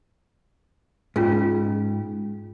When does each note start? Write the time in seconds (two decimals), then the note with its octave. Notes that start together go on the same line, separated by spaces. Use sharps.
1.16 G#2 C#4 F4 G#4